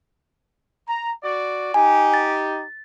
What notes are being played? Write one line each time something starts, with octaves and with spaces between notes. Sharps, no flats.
A#5
F#4 D5
D#4 G4 G#5
A6